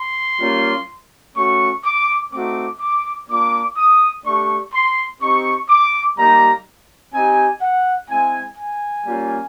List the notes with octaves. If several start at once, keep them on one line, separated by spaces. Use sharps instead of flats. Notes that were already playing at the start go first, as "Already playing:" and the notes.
Already playing: C6
G3 A#3 C#4 F4
A3 C#4 F#4 C#6
D6
A3 C4 D#4 F#4 D6
D6
A#3 D4 F4 D6
D#6
A3 D4 G4 C#6
C6
C4 D#4 G4 C#6
D6
G3 A#3 D#4 G4 A#5
C4 D#4 G4 G#5
F#5
G#3 C4 E4 G#5
G#5
G3 A#3 C#4 F4